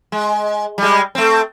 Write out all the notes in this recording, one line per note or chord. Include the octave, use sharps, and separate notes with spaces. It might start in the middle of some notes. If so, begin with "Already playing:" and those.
G#3
G3 G#3
A3 C4